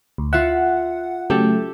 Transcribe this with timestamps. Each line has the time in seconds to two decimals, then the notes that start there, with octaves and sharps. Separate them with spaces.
0.18 D2
0.33 F4 E5 F#5
1.30 C#3 F#3 A3 G4 A4 G5